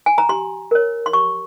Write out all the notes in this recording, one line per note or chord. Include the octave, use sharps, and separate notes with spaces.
G#5
A#5
G4 C6
A#4 C#5
C6
G4 C#6